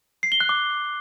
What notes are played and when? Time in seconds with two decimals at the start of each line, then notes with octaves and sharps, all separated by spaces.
0.23 C7
0.32 G7
0.40 F#6
0.49 D6